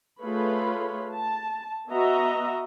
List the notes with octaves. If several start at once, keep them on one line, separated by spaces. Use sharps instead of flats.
A3 F4 G#4 B4 C#5 B5
A5
B3 F#4 D#5 E5 A#5